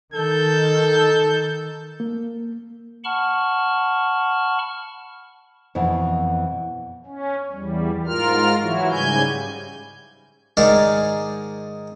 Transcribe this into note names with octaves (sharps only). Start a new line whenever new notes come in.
D#3 A4 G6
A#3
F#5 A5 B5 C#6 F6
F2 B2 E3
C#4
E2 G3
G#2 F4 A#4 F6
E3 F#3 E4 F#4
G#2 C#3 G3 G#5 G6
G#2 D#3 G#3 A#4 D5